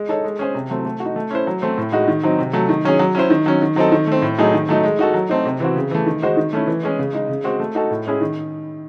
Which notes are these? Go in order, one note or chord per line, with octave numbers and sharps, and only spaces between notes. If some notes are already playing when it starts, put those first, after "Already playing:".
Already playing: G#3
D#4 A4 C#5
G#3
C#4 G#4 C5
C3
F#3 A3 C4
A3
F#4
D#4
A3
C#4 E4 C5
F#3
A3 C4
A2
G#3 D#4 F#4
D#3
F#3 C4 D#4
C3
F#3 A3
D#3
F#3 C#4 G#4 C#5
F#3
C#4 E4 C5
D#3
F#3 C#4
D#3
F#3 C4 D#4 A4
D#3
A3 C4
A2
F#3 A3 D#4 G#4
D#3
F#3 A3 D#4
G#3
D#4 F#4 A4
F#3
A3 C4 D#4
C3
E3 C4 F#4
C#3
E3 A3
D#3
G#3 D#4 F#4 C5
D#3
A3 C#4 E4
E3
G#3 C#4 G#4
C#3
G#3 D#4
C#3
G#3 C4 F#4 C5
A3
D#4 F#4 A4
A2
G#3 C#4 E4 G#4
D#3